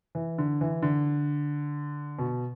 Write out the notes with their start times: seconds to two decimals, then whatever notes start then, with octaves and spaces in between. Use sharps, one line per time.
0.15 E3
0.38 D3
0.61 E3
0.82 D3
2.19 B2